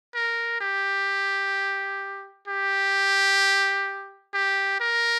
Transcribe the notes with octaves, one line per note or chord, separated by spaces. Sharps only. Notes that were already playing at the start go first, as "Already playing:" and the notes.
A#4
G4
G4
G4
A#4